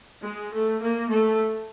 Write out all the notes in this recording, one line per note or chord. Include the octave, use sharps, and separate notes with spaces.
G#3
A3
A#3
A3